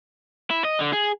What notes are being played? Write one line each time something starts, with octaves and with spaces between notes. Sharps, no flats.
E4
D#5
D3
G#4